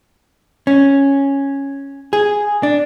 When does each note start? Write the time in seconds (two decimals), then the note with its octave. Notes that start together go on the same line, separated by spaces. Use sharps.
0.67 C#4
2.13 G#4
2.63 D4